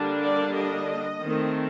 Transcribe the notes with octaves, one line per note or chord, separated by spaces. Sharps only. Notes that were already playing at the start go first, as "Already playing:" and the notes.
Already playing: D3 G3 A#3 D4
D5
D#5
D#3 A3 C4